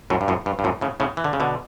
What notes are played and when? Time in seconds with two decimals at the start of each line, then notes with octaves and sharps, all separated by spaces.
0.10 F#2 A2
0.21 G2
0.28 F#2 A2
0.46 G2
0.59 G2
0.64 F#2 A2
0.81 A2 C#3
1.00 A2 C#3
1.17 E3
1.24 D3
1.33 C#3
1.40 B2 D3